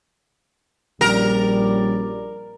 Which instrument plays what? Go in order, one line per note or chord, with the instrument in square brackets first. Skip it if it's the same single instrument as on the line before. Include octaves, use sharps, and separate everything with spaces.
[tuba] A#1 [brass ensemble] G3 C#4 D5 [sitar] A#4